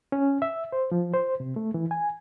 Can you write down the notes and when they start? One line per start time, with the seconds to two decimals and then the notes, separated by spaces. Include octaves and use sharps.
0.12 C#4
0.42 E5
0.72 C5
0.92 F3
1.13 C5
1.40 C3
1.56 A3
1.74 E3
1.91 G#5